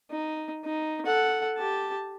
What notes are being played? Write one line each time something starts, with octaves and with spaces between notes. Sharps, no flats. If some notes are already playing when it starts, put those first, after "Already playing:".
D#4
D#4
A4 F#5
G4 A5